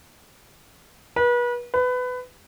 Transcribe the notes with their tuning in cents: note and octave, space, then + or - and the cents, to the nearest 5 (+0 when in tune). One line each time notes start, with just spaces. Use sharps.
B4 -35
B4 +20